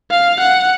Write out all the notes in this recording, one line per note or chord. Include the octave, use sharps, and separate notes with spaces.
F5
F#5